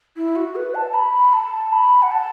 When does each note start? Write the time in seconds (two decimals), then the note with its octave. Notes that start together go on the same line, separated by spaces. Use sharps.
0.17 E4
0.36 F#4
0.55 B4
0.75 A5
0.94 B5
1.33 A5
1.73 B5
2.02 F#5
2.11 A5